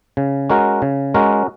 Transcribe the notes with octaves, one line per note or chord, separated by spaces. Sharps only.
C#3
G#3 C#4 F#4 A#4
C#3
G#3 C#4 F#4 A#4